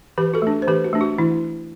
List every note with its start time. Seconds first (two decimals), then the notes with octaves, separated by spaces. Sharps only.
0.18 E3 G4 B4
0.34 F#4 A4
0.42 A3 D4
0.62 C5
0.67 E3 G4 B4
0.85 F#4
0.93 A3 D4
1.01 F#4
1.18 E3 E4